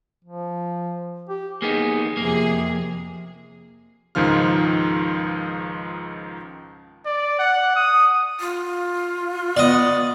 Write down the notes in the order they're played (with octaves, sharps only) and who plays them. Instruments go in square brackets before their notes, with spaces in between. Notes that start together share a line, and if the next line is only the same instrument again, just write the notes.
[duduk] F3
G4
[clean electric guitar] A#3 B3 D#4 [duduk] G#4
[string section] F2 G#4 [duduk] C3 [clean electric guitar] A#3
[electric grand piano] C#2 G#2 D#3 F3 F4 F6
[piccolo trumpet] D5
F#5
D#6
[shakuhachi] F4
[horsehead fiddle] B3 [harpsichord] D5 D#5